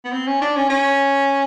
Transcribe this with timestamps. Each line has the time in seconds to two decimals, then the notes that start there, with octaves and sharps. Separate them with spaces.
0.05 B3
0.12 C4
0.27 C#4
0.42 D4
0.56 C#4
0.70 C#4